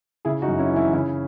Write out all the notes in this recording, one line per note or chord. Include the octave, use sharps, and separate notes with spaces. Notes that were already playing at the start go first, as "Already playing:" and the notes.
C#3 E4 G#4
D#4 F#4
F#2
C#4 E4
E3
C#4 E4
C#3 C#4 E4